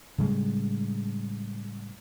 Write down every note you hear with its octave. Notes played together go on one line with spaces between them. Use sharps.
A2 C#3 G3 G#3